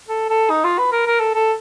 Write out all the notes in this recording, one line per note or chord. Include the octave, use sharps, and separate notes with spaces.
A4
A4
D#4
F4
B4
A#4
A#4
A4
A4